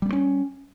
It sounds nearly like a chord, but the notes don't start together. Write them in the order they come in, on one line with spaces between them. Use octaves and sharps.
G3 B3 A3 C#4